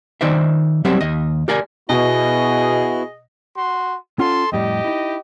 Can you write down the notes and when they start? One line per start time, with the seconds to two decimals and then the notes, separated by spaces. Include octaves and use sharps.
0.21 D#3 D#4 C5 D5 E5
0.85 F#3 G3 C4 G4 C5 E5
1.00 D#2 D#5
1.48 G4 A#4 D5 G#5
1.89 B2 B3 E4 F#4 G#4 D#5
3.56 F#4 C6
4.19 C#4 F4 A4 F#5 C6
4.52 F2 A2 G3 G4 D#5
4.84 D#4 E4